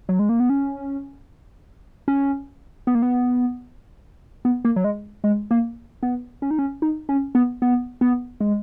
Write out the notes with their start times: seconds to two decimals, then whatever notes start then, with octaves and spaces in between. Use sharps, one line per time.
0.09 F#3
0.19 G#3
0.29 A#3
0.40 B3
0.50 C#4
2.08 C#4
2.87 B3
2.95 A#3
3.02 B3
4.45 B3
4.65 A#3
4.76 F#3
4.84 G#3
5.24 G#3
5.51 A#3
6.03 B3
6.42 C#4
6.51 D#4
6.59 C#4
6.82 D#4
7.09 C#4
7.35 B3
7.62 B3
8.01 B3
8.41 G#3